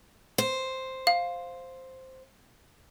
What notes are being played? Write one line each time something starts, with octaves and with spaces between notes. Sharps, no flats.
C5
F5